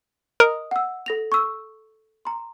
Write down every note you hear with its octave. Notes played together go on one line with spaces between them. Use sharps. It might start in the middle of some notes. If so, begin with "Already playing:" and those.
A#4 D#5 D#6
F#5 E6
A4 A#6 F7
C#6 E6
A#5 C6